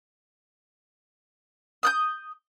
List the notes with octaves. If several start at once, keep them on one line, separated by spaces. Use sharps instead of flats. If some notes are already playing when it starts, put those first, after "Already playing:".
D#6 F#6 G6